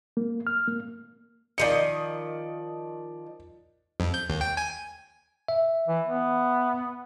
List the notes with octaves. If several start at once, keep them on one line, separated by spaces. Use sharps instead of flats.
A#3
F6
A#3
D#3 F3 D5 D#5 C#7
F2
G6
D#2
G5
G#5
E5
E3
B3